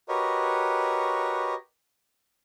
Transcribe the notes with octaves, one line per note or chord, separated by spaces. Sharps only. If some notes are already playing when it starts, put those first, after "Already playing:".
F#4 G4 A#4 B4 C#5 D#5